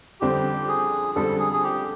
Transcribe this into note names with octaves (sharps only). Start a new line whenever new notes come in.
F2 D3 G3 C4 G4
G#4
F2 D3 G3 C4 A4
G#4
G#4
G4